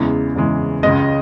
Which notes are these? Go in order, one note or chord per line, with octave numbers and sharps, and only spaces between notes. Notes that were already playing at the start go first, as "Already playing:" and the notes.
Already playing: E2 C#3 E3 G#3
E2 C#3 E3 G#3
C#2 C#3 G#3 D#5